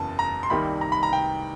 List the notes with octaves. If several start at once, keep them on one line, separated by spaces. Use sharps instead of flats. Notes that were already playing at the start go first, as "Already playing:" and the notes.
Already playing: F#1 E2 C#3 A5
A#5
C6
C2 C3 D#3 G3 A#3 B5
A#5
B5
A#5
G5